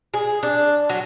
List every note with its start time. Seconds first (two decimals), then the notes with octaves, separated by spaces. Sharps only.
0.14 G#4
0.43 D4
0.89 F#3